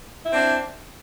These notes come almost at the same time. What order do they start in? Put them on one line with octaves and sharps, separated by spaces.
E4 C4 D4